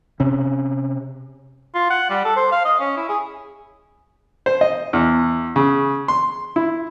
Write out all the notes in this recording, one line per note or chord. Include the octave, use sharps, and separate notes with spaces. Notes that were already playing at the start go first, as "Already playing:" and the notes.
C3 C#4
F4
F#5
G3
A4
C5
F5
D#5
C#4
E4
G#4
C5
D#5
E2
C#3
C6
E4